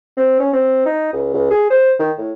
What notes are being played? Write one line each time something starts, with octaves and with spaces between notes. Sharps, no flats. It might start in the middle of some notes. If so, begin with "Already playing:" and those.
C4
C#4
C4
D#4
C#2
C#2
G#4
C5
D#3
A2